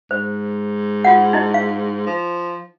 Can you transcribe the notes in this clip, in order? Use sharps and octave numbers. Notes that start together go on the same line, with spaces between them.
G#2 C5
F4 F#5
D#4 E4 D#5
F5
F3